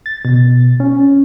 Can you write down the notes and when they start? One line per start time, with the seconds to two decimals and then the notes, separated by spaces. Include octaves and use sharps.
0.06 A6
0.25 B2
0.80 C#4